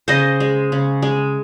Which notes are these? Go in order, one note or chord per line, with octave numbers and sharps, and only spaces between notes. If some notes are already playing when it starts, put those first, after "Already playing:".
C#3 C5 D#5
G#3
C#3
G#3